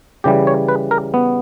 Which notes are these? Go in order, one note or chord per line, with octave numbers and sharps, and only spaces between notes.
C#3 E3 G3 G4
C#5
B4
A#4
B3